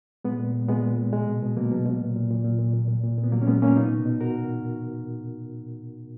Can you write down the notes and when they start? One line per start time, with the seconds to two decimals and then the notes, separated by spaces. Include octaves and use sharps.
0.24 A#2 G#3 B3
0.40 A#2
0.54 A#2
0.68 A#2 G#3 B3
0.84 A#2
0.98 A#2
1.12 B2 G#3
1.28 B2
1.42 B2
1.57 B2 F#3 A#3
1.72 B2
1.86 B2
2.00 A#2
2.16 A#2
2.30 A#2
2.45 A#2
2.59 A#2
2.74 A#2
2.88 A#2
3.03 A#2
3.18 A#2
3.24 B3
3.32 A#2 F#3 A#3
3.42 C#4
3.47 A#2 G#3 B3
3.62 A#2 A#3 C#4
3.76 B2 B3 D#4
3.92 B2
4.06 B2
4.21 B2 F#4 A#4